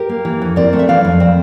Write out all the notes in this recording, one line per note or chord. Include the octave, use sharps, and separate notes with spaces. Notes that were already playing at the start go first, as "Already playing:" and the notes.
Already playing: G4 A#4
A#3
E3
F2
C4 A#4 D5
A3
E5
E3 D5 F5
F2
C4